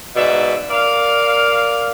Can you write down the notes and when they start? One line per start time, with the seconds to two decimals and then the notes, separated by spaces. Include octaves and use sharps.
0.15 G#2 B2 D5 E5
0.70 A#4 D5 F5